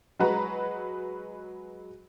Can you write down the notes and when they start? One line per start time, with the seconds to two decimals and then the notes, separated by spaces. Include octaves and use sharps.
0.19 F#3 G#3 F#4 B4 A#5